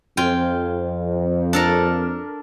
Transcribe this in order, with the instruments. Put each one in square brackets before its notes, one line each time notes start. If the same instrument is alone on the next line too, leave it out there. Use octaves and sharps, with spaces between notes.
[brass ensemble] F2 [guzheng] F4 G5 G#5
[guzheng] D4 A4 A#4